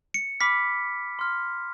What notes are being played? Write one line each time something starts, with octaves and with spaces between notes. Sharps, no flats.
C#7
B5 D6 F6 B6
C6 F6